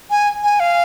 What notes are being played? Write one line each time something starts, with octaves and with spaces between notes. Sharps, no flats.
G#5
G#5
F5